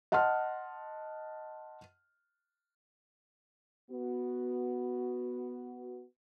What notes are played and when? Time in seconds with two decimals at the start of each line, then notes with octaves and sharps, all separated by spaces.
0.12 D#5 F#5 A5 C6 F6
3.90 B3 F#4